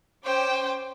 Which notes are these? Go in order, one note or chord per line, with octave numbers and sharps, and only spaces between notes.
C#4 C5 G5 D6